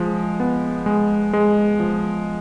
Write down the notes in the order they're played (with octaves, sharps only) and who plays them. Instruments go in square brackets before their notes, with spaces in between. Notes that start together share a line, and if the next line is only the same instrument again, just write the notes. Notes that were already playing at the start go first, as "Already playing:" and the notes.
Already playing: [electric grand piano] F3 G#3
B3
G#3
G#3
F3